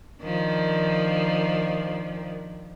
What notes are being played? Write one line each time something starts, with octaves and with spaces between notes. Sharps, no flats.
D#3 F3 D4